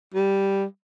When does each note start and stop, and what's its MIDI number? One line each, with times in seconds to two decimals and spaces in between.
0.14 0.64 55